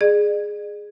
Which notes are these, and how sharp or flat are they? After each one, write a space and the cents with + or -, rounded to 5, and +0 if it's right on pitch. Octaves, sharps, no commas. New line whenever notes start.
G#4 +0 D5 +45